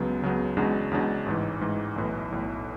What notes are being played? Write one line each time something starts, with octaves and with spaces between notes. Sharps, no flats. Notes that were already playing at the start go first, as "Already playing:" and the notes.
Already playing: C#2 C#3 F#3 B3
C#2 C#3 F#3 B3
E2 C#3 G#3 D4 F#4
E2 C#3 G#3 D4 F#4
A1 G#2 E3
A1 G#2 E3
B1 A2 E3
B1 A2 E3